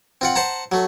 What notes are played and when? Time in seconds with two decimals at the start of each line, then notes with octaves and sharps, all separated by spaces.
0.21 C4 F4 F#5
0.35 C5 F#5 A5 A#5
0.72 F#3 A3